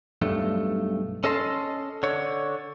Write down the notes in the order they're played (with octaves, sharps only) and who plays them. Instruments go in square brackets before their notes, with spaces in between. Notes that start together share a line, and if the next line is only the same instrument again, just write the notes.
[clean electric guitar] B1 G2 A3
C#4 A4 D#5 A5 C6
D3 C#5